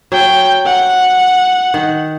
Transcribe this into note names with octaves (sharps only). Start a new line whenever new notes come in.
F#3 G5
F#5
D#3